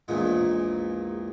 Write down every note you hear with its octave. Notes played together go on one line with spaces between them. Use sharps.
A#1 E2 A#2 G#3